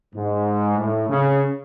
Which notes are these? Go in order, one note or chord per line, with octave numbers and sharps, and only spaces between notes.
G#2
A2
C#3